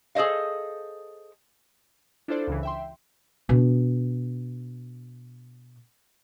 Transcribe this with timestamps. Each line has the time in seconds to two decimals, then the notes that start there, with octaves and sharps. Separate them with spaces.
0.15 G#4 A4 C5 D#5 F5
2.28 D4 E4 F4 A4 C5 D5
2.47 C#2 C#3 E3
2.63 E5 G5 C6
3.49 B2 D4